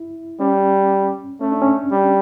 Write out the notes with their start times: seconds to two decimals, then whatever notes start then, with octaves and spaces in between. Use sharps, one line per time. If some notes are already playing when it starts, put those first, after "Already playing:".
Already playing: E4
0.40 G3 C#4
1.41 A3 C#4
1.52 D4
1.62 C#4
1.91 G3